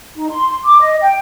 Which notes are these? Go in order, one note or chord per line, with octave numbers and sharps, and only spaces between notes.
D#4
C6
D6
D#5
G5